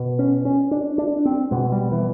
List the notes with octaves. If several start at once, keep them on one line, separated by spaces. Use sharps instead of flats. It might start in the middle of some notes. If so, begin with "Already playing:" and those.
Already playing: B2
C#4
C#4
D4
D4
C4
B2 G#3
G3
E3